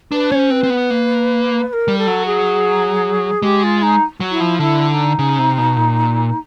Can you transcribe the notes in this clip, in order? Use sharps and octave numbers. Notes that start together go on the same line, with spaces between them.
D4 B4
C#4 C5 C#5
C4 B4
C4
B3
A#3
B4
A#4
G3
A4
F#3
G#4
G#3 G4
F4
D#4
F#3
E4
F3
D3 E4
E4
D#4
C#3
C3
B2
A#2